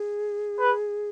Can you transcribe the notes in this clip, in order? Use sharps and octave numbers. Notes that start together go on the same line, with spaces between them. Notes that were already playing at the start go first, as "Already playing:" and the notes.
Already playing: G#4
B4